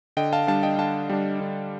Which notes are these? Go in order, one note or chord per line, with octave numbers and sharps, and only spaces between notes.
D3 D#5 G5
F5 A5
G3 D4 F5 A5
D#5 G5
D3 F5 A5
G3 D4
D3